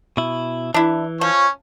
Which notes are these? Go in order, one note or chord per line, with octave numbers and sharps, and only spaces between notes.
B2 E4
E3 D4 E4
F3 C#4 C#5